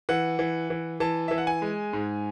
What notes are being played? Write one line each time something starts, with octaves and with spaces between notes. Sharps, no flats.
E3 F#5
E3
E3
E3 A5
E3 E5
F#5
G#5
G#3
G#2